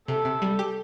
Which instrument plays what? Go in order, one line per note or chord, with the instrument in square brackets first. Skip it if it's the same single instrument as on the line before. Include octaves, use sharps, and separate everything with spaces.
[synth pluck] C3 [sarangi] A4
[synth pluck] C3
G3
G4